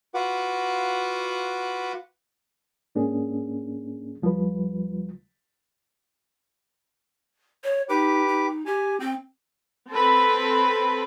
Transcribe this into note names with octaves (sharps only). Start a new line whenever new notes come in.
F4 F#4 B4 F#5 D6
G#2 A#3 C#4 D4 G#4
D#2 F3 G3 F4 B4
C#5
D#4 G4 B4 D6
D#4
G4 G#5
C4 G5
C4 A4 B4